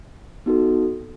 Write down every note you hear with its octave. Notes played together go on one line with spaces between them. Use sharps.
B3 D#4 F#4 A4